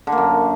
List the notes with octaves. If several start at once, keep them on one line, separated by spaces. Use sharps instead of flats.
D3
A#3
F#2